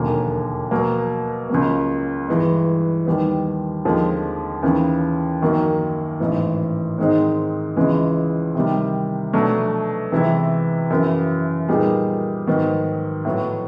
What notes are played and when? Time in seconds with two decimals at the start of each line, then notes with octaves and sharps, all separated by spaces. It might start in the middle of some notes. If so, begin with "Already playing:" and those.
Already playing: E1 D#2 D3 F#3 A#3
0.71 B2 F#3 A#3
1.49 C#2 C#3 F#3 A#3
2.28 G2 E3 G#3
3.06 D#2 D#3 G3 B3
3.85 D#2 D3 F3 G#3 C4
4.63 D#2 C#3 E3
5.42 F#2 D#3 F#3 A#3
6.20 A1 G#2 E3
6.98 G#2 D#3 G#3 C4 D#4
7.76 C#2 C#3 E3 G#3
8.55 C3 D#3 G3
9.33 B2 F#3 A3 D4
10.12 C3 E3 G#3 B3 E4
10.90 F#2 C#3 E3
11.69 A#2 G3 B3 D#4 G#4
12.47 G#2 D#3 F#3 B3
13.25 A2 F#3 B3